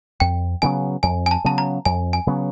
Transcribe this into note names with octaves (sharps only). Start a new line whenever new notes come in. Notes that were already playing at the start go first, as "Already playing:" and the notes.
F2 G5
C#3 F#3 B3 G#5
F2 G#5
G#5
A5
C#3 F#3 B3 A5
A#5
F2 G#5
G#5
C#3 F#3 B3